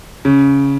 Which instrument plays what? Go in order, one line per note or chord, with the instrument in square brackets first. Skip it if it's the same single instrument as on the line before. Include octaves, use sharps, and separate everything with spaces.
[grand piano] C#3